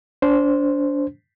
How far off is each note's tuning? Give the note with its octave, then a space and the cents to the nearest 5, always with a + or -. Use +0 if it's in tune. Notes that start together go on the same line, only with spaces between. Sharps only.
D4 -30 C5 -5